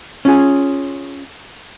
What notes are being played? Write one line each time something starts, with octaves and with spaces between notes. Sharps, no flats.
C#4 F4 G#4